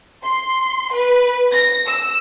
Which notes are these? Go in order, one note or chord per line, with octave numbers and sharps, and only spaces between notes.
C6
B4
A#6
E6